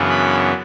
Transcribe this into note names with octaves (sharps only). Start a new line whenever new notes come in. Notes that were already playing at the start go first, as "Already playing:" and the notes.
Already playing: F#2 C#3 E3 B3 D4
B5